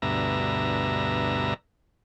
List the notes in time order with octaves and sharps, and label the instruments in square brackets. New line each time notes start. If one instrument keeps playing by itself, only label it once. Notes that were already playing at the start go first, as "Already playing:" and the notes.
[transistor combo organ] D2 G2 B2 E5 A#5